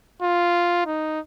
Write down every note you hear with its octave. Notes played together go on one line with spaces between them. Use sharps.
F4
D#4